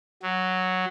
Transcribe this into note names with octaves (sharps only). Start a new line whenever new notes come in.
F#3